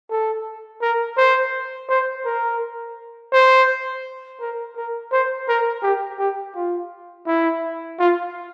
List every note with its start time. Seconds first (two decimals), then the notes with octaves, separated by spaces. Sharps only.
0.11 A4
0.82 A#4
1.17 C5
1.89 C5
2.25 A#4
3.33 C5
4.41 A#4
4.77 A#4
5.12 C5
5.48 A#4
5.83 G4
6.19 G4
6.55 F4
7.27 E4
7.99 F4